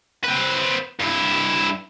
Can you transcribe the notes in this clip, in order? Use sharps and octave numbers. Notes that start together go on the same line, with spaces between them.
C4 B4
G2 E4